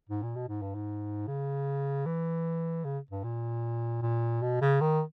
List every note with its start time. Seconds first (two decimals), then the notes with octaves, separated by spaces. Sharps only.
0.09 G#2
0.23 A#2
0.36 B2
0.49 G#2
0.62 G2
0.75 G#2
1.27 C#3
2.06 E3
2.85 C#3
3.11 G2
3.24 A#2
4.02 A#2
4.42 B2
4.61 C#3
4.81 D#3